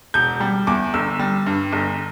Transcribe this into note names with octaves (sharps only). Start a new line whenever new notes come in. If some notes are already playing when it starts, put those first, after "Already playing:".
E1 G6
G3
E2 D6
G1 E6
G3
G2
G1